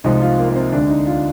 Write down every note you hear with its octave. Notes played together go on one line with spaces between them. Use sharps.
C2 C3 F3 G#3 D#4
F4
A#3
A#3
C4
D2 D3 G#3 D4
D#4
F4